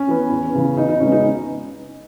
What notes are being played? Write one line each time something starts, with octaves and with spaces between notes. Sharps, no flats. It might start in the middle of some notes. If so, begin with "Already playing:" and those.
Already playing: C#4
E3 B3
E2
C#3 E3 B3
E2 D#4
D#4
C#3 G#3 B3 C#4
D#4